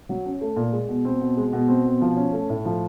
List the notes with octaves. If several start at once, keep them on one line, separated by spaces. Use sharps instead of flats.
F#3
C#4
A3
A#2
G#3
B2
C4
B2
G#3
B2
C4
B2
F3
C#4
A3
A2
F3